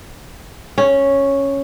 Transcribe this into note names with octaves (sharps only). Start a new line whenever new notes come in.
C#4